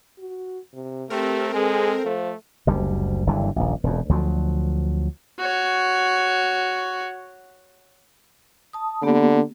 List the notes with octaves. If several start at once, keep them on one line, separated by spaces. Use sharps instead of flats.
F#4
C3
A3 C4 G4 A#4
G#3 G#4 A4
F3 A3
F#1 D2 G3
F#1 G2 D3 E3
D#1 A#1
E1 F2
D2 F3 F#3
F#4 C#5
A5 D#6
D3 A#3 B3 G4